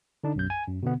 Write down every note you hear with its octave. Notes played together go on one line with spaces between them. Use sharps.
D3 D4 D#4
B1 F#2 G6
G#5
F#2
B2 D3 B3